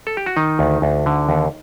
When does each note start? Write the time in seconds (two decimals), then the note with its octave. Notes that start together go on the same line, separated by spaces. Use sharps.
0.07 A4
0.17 G4
0.26 F#4
0.36 D#3 D#4
0.59 D2
0.82 D2
1.06 D3
1.29 D#2